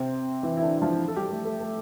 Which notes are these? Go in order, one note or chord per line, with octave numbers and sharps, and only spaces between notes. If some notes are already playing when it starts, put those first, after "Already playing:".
Already playing: C3 C4
E3 E4
E4
D3 D4
E4
F3 F4
A4
G3 G4
A3
A3
A3